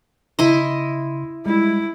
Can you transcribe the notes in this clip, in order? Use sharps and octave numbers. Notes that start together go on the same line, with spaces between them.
C#3 E4 D#5 C6
G3 G#3 E4